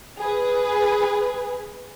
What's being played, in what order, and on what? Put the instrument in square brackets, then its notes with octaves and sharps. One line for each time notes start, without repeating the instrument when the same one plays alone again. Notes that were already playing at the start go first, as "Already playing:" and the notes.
[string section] G#4 B4